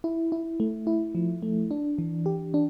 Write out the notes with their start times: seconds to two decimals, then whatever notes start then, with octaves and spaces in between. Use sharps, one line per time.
0.04 E4
0.32 E4
0.60 A3
0.87 E4
1.15 F3
1.42 A3
1.71 D4
1.98 E3
2.26 G4
2.54 D4